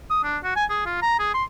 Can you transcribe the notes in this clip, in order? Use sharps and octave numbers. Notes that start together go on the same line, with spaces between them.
D#6
D4
F#4
G#5
G#4
F4
A#5
G#4
C6